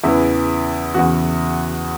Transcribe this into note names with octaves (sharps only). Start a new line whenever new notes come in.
E2 C#3 E3 E4
E2 C#3 E3 F#4